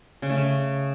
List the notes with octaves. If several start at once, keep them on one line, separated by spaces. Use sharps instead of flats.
C#3
A3
C#3